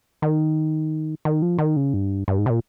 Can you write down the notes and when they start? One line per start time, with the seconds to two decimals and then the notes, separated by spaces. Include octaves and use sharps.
0.22 D#3
1.25 D#3
1.42 F3
1.58 D#3
1.76 C#3
1.94 G2
2.28 G2
2.39 G#2
2.46 C3
2.50 A#2